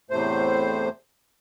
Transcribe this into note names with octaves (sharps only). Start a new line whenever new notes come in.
E2 A2 C3 A3 C5